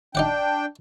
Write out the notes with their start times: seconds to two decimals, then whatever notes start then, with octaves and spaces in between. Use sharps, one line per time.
0.15 D4 D#4 D5 F#5 G5